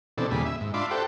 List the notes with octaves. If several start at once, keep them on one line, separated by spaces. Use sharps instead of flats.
B2 E3 C4 D4 A4
D#2 A#2 C#3 G3 G#4 B5
E5
G#2
D4 F4 E5 B5 C6 D6
G4 A4 C5 F#5 G5